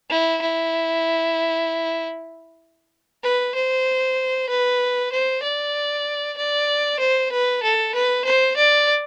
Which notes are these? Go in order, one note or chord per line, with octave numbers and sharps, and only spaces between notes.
E4
E4
B4
C5
B4
C5
D5
D5
C5
B4
A4
B4
C5
D5